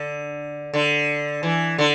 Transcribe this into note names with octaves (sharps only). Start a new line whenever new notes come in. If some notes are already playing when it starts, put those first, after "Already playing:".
Already playing: D3
D3
E3
D3